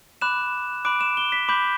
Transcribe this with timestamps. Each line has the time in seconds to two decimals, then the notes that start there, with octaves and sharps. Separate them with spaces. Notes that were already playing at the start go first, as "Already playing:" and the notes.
0.21 B5 D6 F#6 E7
0.85 B5 D6 F#6 D7
1.01 E7
1.17 G7
1.32 B6
1.49 B5 D6 G6